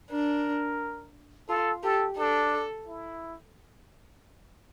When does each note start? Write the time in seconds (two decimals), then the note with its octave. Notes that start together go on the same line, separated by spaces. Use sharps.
0.10 D4 A#4
1.49 F4 A4
1.83 G4 A4
2.17 D4 A4
2.88 E4